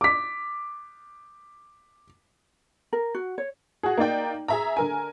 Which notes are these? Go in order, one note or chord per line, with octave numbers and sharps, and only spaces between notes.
D6 B6
A#4
F#4
C#5
F#4 G#4
A#3 D#4 D5 G5
G#4 E5 A#5
D3 A#4 G#5